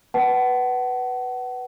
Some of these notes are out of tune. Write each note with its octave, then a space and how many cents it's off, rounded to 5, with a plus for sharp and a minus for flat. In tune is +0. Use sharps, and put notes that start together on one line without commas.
B4 +0 F#5 +30 A5 -25